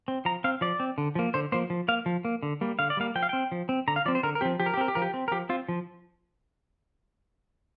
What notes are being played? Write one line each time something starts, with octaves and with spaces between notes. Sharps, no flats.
C4
F3 A#5
C4 F5
F3 D5
C4
D3
F3 A#3
D3 C5
F3 A#3 C5
F3
A#3 F5
F3
A#3
D3
G3 A#3
D3 F5
D5
G3 A#3 F5
F3 G5
F5
C4 G5
F3
C4
D3 A#5
F5
F3 C4 D5
C5
D3 A#4
A#4
F3 C4 G4
F3 G4
A#4
G4
C4 A#4
G4
F3 A#4
G4
C4
A#4
F3 G4
C4 F4
F3